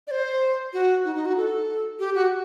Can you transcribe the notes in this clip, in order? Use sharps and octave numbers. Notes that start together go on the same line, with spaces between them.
D5
C5
F#4
D#4
D#4
F#4
A4
G4
F#4